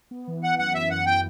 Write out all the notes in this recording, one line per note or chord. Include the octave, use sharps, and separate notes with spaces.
B3
E3
E3 F#5
F#2 F#5
F#2 E5
F#2 F#5
E3 G5